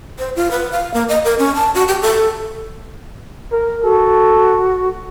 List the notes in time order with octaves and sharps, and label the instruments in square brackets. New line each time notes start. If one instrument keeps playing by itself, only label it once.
[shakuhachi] C5
F4
B4
F5
A#3
D#5
A#4
C#4
A5
F#4
G4
A4
[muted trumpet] A#4
[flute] F#4 [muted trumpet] A4